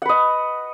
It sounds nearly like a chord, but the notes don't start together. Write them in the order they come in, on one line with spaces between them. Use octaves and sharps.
F#5 B4 D#5